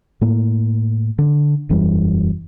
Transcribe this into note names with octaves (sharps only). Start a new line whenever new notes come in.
A2 A#3
D3
E1 F#2 E3 G3